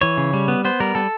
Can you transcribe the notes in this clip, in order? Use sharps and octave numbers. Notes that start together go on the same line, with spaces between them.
E3 C#5
C#3
G3
B3
B3 C5
G3 A#4
G3 A4